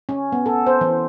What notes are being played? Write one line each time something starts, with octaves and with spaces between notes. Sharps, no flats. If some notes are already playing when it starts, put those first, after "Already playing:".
C#4
B3
A4
C5
E3